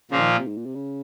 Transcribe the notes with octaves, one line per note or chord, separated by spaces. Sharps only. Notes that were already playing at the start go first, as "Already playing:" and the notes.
A#2 C#3 F3 A#3 F4
D#3
C3
G#2
A#2
C3
C#3